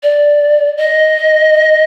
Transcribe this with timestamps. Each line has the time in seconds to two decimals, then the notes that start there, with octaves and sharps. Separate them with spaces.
0.03 D5
0.78 D#5